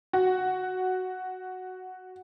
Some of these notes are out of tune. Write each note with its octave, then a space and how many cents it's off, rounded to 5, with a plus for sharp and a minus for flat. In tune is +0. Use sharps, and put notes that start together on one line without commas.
F#4 +0